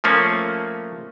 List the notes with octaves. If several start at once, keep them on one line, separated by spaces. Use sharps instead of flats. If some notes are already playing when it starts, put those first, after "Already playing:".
F3 A3 A#3 C#4